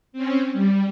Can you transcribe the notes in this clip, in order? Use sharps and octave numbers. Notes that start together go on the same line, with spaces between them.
C4 C#4
G3